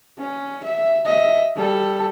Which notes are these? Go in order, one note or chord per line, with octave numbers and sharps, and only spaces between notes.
C#4
E5
D#5 E5
G3 A4